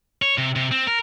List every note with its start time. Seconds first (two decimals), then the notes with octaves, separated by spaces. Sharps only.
0.22 C#5
0.38 C3
0.56 C3
0.71 C4
0.87 A#4